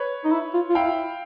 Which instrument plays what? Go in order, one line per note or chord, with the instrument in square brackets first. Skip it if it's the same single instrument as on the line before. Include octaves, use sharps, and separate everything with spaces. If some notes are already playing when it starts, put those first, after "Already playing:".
Already playing: [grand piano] B4 C#5
[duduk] D#4
E4
F4
F4
[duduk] E4 [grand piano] F5 G5